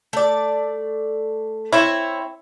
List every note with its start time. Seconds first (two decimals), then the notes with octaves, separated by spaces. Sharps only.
0.13 A3 D5
1.73 C4 E4 C#5 E5